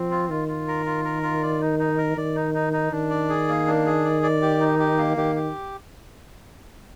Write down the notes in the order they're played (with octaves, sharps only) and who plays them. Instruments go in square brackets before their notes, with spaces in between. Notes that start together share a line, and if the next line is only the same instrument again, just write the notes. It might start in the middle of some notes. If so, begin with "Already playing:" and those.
Already playing: [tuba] F3 [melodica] C4
[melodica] F4
[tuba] D#3 [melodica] F4
[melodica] F4
A#4
F4
A#4
F4
D5
D#4
D#4
A#4
[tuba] D#3 [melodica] D5
[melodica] D#4
D#4
D#4
[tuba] D#3 [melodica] D4
[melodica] D5
G#4
A#3
D4
G#4
D5
D5
G4
D#4
G4
A#3
[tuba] D#3 [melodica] G4
[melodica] G4